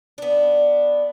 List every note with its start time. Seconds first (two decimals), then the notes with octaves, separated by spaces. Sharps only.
0.18 B3 D4